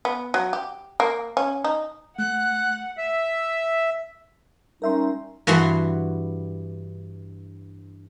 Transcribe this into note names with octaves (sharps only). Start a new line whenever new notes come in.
B3
F#3
G4
A#3
C#4
D#4
A3 F#5 F#6
E5
G3 C#4 D#4 A#4 E5 C6
G2 E3 F#4 F#5 C6